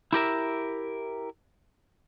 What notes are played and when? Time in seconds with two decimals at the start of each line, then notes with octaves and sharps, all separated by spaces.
0.13 E4 G4 A#4 E5